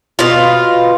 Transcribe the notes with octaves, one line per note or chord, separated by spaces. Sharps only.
B2 F4